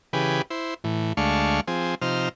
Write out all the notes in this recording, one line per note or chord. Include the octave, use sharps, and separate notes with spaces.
C#3 E3 G4 G#4 B4
E4 C5
A2 E3
D2 G#3 A3 D4 F5 C#6
F3 C4 G#4
C3 F3 D#4 C5 F6